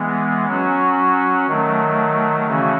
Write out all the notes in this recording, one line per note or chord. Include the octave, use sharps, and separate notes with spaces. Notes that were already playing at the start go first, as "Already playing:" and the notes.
Already playing: E3 G#3 B3
F#3 C#4 F#4
D#3 F#3 A3
C#3 E3 A3 C#4 F#4